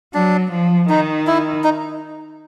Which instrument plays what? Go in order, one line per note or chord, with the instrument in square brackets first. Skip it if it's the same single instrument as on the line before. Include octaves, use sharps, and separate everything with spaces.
[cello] F#3 [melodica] D4
[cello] F3
[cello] D#3 [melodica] D#4
[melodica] E4
D#4